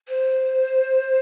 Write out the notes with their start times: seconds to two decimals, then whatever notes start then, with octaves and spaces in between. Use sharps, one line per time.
0.08 C5